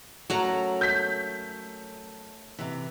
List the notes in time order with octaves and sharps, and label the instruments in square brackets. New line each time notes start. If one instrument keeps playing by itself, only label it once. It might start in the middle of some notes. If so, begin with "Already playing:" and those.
[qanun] F#3 F#5 A#5 [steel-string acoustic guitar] A3 C#4 A#4
[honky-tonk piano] G6 B6
[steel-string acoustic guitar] C3 E3